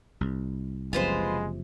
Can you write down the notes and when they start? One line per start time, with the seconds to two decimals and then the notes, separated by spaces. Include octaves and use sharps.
0.21 C2
0.93 F#1 C3 F3 G#3 F4 B4 C5